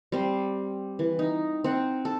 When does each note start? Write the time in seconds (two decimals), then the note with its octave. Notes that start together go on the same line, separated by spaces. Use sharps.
0.12 G3 C4 C6
0.99 E3
1.19 D#4
1.64 C4 F#5
2.05 A4